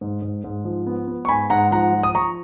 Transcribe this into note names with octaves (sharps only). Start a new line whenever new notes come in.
G#2
G#2
G#2
F3
B3
B3
C#6
G#2 G#5 B5
G#2 F#5 A#5
F3 F#5 A#5
F3
D#6
F3 A#5 C#6